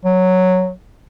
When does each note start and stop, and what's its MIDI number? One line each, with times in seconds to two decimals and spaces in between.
0.05 0.71 54